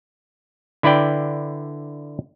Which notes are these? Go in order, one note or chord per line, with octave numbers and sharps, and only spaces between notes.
D3 E4 B4 D5 G5